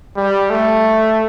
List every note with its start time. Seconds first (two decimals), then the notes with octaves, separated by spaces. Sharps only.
0.17 G3
0.50 A3